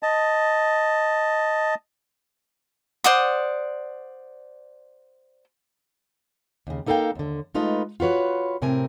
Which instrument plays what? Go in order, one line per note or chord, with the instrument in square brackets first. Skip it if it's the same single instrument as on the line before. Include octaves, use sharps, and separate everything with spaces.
[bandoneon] D#5 A5
[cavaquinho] C5 D5 F#5 D#6
[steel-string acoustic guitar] D#2 C#3
A#3 D#4 A4 A#4 F5 G5
D#2 D3
G#3 A3 D#4 F4 B4 D#5
F4 F#4 B4 C#5
A2 C3 C4 A#4 G#5